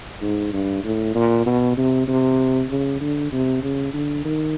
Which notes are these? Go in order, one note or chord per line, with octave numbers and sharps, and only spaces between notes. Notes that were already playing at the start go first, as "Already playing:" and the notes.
G#2
G2
A2
A#2
B2
C3
C3
C#3
D3
C3
C#3
D3
D#3